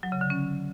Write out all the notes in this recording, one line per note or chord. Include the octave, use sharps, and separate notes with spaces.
F#3
C#3
D3
C#4